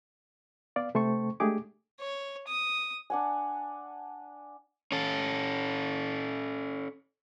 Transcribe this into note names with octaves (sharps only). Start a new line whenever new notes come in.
B3 D5 F5
C3 A3 C5 G5 A5 C#6
G#3 A3 D4 G4 G#4 D6
C#5
D#6
D4 F#5 G#5
C#4 A4